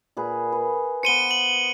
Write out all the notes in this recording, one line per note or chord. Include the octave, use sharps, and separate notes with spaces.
A#2 G#4 B4
B4
B3 C5 C#7 D#7 G7
F#7